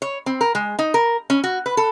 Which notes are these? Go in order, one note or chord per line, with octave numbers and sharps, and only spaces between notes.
C#5
C4
A#4
G#3
D#4
A#4
C#4
F#4
B4
A4